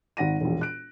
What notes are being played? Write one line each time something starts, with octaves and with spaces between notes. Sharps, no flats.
G#1 F#5 A#6 D#7
E1 A#1
F#6 D7